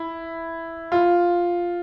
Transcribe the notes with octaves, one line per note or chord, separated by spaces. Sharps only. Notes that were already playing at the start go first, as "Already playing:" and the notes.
Already playing: E4
F4